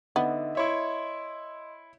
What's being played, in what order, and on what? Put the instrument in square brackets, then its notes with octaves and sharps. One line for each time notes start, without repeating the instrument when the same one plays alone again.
[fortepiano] D3 [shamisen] B3 [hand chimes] D#4 D#5 E5
[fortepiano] E4 C#5 E5 [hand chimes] D#5 C6